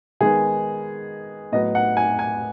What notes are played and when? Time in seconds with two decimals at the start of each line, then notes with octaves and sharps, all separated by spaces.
0.21 D#3 G#3 B3 G#4
1.52 A2 F#3 B3 D#5
1.75 F#5
1.97 G#5
2.19 G#5